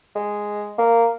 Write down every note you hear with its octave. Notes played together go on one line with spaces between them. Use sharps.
G#3
A#3